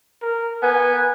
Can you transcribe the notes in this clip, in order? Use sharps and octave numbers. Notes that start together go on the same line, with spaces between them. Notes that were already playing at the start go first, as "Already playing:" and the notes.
A#4
B3 G#5